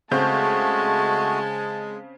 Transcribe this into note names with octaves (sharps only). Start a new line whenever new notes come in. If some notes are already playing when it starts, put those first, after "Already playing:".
C#3 G#3 A3 C4 F#4 A5 G6